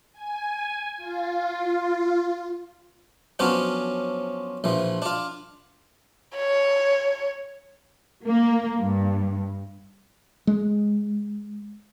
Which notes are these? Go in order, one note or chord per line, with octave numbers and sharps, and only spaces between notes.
G#5
F4
F3 F#3 B3 C#4 D4 F4
A#1 E3 F3
D4 F4
C#5
A#3
G2
G#3